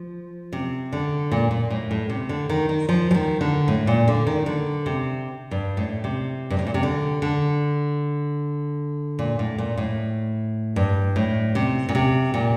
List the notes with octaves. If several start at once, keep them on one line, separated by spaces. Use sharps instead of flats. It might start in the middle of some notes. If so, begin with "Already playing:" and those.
Already playing: F3
C3
D3
A#2
A#2
A2
A2
C3
D3
D#3
D#3
F3
F3
D#3
D3
A2
A#2
D3
D#3
D3
C3
G2
A2
C3
G2
A2
A#2
C3
D3
D3
A#2
A2
A#2
A2
G2
A2
C3
A#2
C3
A#2